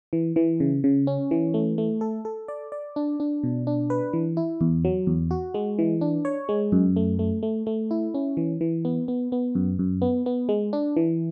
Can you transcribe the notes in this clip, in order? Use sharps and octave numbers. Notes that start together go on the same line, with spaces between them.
E3
E3
C#3
C#3
C#4
E3
A3
A3
A4
A4
D5
D5
D4
D4
B2
D4
B4
E3
E4
E2
F#3
E2
F#4
G#3
E3
D4
C#5
G#3
F#2
A3
A3
A3
A3
E4
C#4
E3
E3
B3
B3
B3
F#2
F#2
B3
B3
G#3
D4
E3